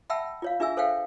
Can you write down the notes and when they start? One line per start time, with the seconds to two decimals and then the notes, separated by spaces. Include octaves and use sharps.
0.10 E5 F#5 G5 A5 B5 E6
0.42 F4 C#5 F5
0.60 D4 F4 G#4 E5 G#5 E6
0.77 A4 C5 C#5 E5 F5 G5